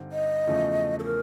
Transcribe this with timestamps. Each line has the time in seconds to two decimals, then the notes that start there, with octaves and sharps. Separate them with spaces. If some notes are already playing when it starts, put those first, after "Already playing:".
Already playing: G2 D3 G3 C4 D#4
0.12 D#5
0.47 E2 C#3 F3 A3
0.99 A4
1.04 A#4